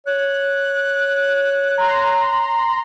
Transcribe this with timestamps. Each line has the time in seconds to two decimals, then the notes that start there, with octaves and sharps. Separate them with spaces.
0.07 C#5 F#6
1.78 A#5 C6